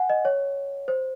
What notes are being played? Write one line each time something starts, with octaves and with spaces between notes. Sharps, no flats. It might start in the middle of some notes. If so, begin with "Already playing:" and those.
Already playing: F#5 G#5
D#5
C#5
C5